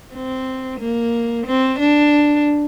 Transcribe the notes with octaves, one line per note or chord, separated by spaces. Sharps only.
C4
A#3
C4
D4